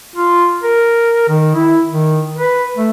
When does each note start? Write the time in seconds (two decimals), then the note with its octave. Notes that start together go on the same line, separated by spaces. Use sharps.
0.16 F4
0.63 A#4
1.29 D#3
1.55 E4
1.89 D#3
2.36 B4
2.77 A3